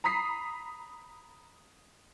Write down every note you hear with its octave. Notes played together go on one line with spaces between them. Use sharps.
A#5 B5 D#6 B6 C7